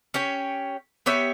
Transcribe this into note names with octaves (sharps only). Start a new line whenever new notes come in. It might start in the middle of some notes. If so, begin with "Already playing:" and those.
C#4 G4 C#5
B3 G4 C#5 E5